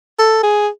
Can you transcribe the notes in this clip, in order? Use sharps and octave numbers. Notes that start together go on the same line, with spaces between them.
A4
G#4